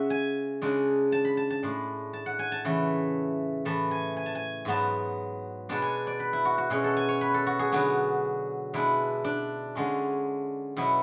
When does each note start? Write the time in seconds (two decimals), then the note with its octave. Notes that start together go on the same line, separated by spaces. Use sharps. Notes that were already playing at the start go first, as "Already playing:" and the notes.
Already playing: C#3 G#3 C#4 E5 F#5
0.10 G#5
0.62 C#3 G#3 D4
1.12 A5
1.25 B5
1.37 A5
1.50 A5
1.63 A2 G#3 D4
2.13 A5
2.26 F#5
2.39 G#5
2.52 A5
2.65 C#3 E3 A3
3.65 A2 E3 A3 A5
3.91 G#5
4.17 G#5
4.26 A5
4.35 G#5
4.65 G#2 F#3 B3 A5
5.69 B2 G#3 B3 D4 A5
5.82 G#5
6.07 D5
6.20 B4
6.33 E4
6.45 F#4
6.58 F#4
6.70 B2 G#3 C#4 G#4
6.84 A4
6.96 G#5
7.09 C#5
7.21 B4
7.34 A4
7.47 F#4
7.59 G#4
7.72 D3 F#3 B3 F#4
8.74 B2 G#3 D4 E4
9.24 D4
9.75 D3 G#3 C#4
10.77 B2 F#3 B3 E4